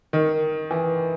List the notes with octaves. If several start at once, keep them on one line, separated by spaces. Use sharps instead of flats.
D#3
E3